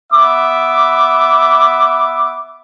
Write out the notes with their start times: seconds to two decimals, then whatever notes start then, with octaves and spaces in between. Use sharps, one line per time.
0.12 B3 E5 D6